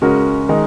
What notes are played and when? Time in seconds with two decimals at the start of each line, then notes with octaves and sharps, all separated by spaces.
0.02 C#3 G#3 C#4 F#4 A#4
0.49 D#3 G#3 D#4